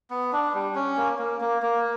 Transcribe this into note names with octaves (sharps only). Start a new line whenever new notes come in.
B3
D4
G3
C#4
A#3
A#3
A#3
A#3